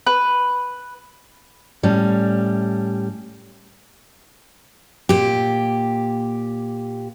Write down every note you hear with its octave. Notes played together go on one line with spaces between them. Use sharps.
B4
A2 G3 C#4
A#2 G4